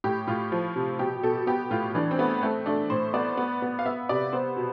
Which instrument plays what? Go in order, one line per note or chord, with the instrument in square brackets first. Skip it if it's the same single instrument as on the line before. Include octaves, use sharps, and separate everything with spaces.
[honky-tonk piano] A2 G4
A2 F4
F3
C3
B2 G4
B2 A4
B3 G4
A2 F4
E3 D4
C4
A3 B3
A3 C4
A3 D4
A2 C5
B3 D5
B3
B3
F5
B3 E5
C3 D5
B3 C5
B2